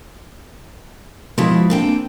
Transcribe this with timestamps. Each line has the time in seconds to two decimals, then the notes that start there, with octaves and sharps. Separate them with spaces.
1.38 B2 F3 G#3 E4
1.70 D3 A#3 C4 G5